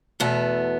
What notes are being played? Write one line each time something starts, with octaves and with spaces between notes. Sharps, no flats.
E2 B2 A3 B3